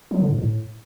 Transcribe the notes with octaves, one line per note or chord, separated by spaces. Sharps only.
F#3
D3
G#2
A2